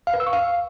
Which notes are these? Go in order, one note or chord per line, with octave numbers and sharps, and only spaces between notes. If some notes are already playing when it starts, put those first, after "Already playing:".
F5
B4
E6
C#6
F5